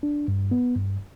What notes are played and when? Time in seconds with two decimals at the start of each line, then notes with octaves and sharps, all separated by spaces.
0.03 D4
0.28 G2
0.51 B3
0.76 G2